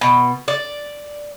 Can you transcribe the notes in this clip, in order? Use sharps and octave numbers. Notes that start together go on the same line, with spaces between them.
B2
D5